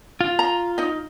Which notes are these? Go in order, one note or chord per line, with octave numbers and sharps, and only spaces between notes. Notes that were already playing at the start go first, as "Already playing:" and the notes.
F4
A#5
D#4 D#5